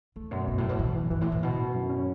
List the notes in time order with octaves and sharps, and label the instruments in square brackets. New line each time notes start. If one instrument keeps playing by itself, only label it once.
[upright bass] E2 [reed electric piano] A3
[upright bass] F#2 [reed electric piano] B2
[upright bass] G2 [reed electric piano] B2
[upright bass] A2
[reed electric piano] F#3
[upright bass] B2
[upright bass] B2 [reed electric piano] E3
[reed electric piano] E3
[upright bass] G2 [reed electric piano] E3
[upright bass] A2
[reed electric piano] E4
[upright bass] A2
[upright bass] B2 [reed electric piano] D3
[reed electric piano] F#2
F#2
C#4